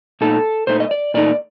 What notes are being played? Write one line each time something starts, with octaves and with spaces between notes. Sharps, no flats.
A#2 A3 D#4 A4
A#2 A3 D#4 C5
D#5
D5
A#2 A3 D#4 D5